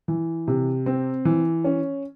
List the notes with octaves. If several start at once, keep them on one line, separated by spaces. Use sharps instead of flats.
E3
C3
C4
E3
C#4